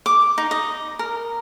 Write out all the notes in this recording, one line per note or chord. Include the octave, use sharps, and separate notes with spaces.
D6
D#4
D#5
A#4